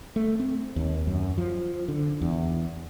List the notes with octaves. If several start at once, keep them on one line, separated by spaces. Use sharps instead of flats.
A3
C4
D#2
F#2
F3
D3
E2